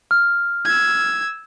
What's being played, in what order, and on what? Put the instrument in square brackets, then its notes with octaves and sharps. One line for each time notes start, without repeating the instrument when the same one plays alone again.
[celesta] F6
[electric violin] E6 G#6